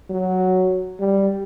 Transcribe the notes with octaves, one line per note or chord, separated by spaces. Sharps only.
F#3
G3